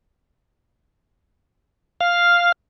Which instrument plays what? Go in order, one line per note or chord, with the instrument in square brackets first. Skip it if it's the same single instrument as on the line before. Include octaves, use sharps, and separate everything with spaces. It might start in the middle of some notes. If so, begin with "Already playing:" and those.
[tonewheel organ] F5